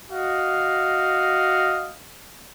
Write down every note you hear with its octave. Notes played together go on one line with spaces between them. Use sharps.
F#4 D#5 F5